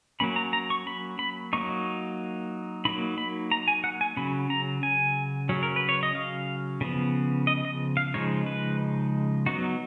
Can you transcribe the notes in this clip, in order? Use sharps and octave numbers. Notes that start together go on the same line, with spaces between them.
F#3 A#3 C#4 B5
A#5
A#5
C#6
B5
B5
F#3 A#3 D#4 C#6
F#3 A#3 D#4 B5
B5
A#5
G#5
F#5
G#5
C#3 F#3 C#4 B5
A#5
G#5
C#3 F#3 C#4
A#4
B4
C#5
D#5
F5
C#3 F3 B3
D#5
D#5
F5
C#3 F3 G#3 D#4 C#5
B4
F#3 B3 D#4 F#4